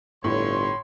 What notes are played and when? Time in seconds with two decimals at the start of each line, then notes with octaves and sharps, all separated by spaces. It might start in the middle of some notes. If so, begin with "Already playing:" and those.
0.24 G1 A2 C#5 C6